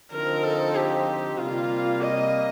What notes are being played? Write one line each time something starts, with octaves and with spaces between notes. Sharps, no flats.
D3 F3 C4 D#4 A#4
A4
G4
C3 G3 A#3 F4
D#5